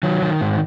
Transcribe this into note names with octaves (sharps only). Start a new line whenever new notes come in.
D#3 F#3
D#3
G#2